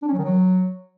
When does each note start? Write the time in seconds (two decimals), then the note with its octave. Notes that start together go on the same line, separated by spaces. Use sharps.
0.02 D4
0.08 C#4
0.13 F#3
0.18 D#3
0.24 F#3